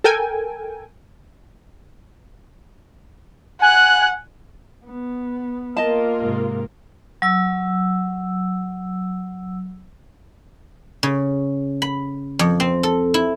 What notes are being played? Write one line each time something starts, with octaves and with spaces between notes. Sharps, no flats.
A4 A#4 G5 G#5
F#5 G#5 F#6
B3
A#3 F4 A#4 D#5 A5
G#2 C3
F#3 E6
C#3
B5
F2
C4
A4
E4